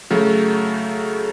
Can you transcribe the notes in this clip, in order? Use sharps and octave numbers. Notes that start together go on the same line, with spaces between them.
C#3 F#3 A3